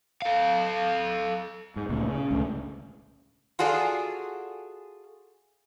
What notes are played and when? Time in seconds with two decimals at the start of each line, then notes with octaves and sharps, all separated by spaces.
0.22 A4 F5
1.76 G#2
1.89 D2 A#2 C#3
2.08 C#3
2.31 C#2 A2 D3
3.59 F4 F#4 G#4 A4 D5